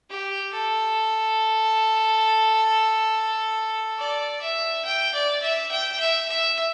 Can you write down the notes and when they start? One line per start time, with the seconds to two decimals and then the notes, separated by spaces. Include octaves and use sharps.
0.10 G4
0.53 A4
3.98 D5
4.41 E5
4.85 G5
5.14 D5
5.42 E5
5.71 G5
6.00 E5
6.29 E5